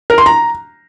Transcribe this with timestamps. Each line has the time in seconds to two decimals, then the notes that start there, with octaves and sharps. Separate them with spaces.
0.10 A#4
0.18 C6
0.26 A#5